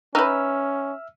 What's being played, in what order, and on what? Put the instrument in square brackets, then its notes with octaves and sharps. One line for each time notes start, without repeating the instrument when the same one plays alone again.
[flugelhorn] C#4 [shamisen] D#4 B4 [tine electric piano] E5 E6 F6